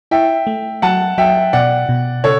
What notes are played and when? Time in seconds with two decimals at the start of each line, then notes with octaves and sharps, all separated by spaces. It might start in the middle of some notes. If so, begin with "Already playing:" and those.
0.11 E4 E5 G5
0.47 A3
0.82 F#3 F#5 A5
1.18 F#3 E5 G5
1.53 B2 D5 F#5
1.89 B2
2.24 C#3 A4 C#5